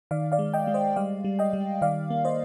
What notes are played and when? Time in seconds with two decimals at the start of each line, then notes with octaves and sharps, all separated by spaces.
0.11 D#3 D5 F5
0.32 D5 F5
0.39 G#3
0.54 D#5 G5
0.67 G#3
0.74 C5 D#5
0.96 G3 D5 F5
1.25 G3
1.39 D#5 G5
1.53 G3
1.81 D#3 D5 F5
2.10 A#3
2.25 C5 D#5